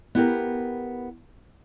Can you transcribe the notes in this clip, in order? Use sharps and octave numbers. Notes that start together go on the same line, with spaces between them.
B3 E4 G4 A#4